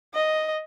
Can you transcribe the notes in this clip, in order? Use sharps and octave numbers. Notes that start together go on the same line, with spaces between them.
D#5